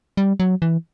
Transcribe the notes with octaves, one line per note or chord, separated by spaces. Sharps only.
G3
F#3
E3